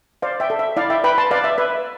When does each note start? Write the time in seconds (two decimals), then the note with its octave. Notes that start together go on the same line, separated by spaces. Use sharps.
0.22 C5 D5 F5
0.40 E5 G5
0.50 A4
0.59 E5
0.77 E4 D5 F5
0.90 E5 G5
1.04 B4 G5 B5
1.18 A5 C6
1.31 B4 D5 F5
1.44 E5
1.58 B4 E5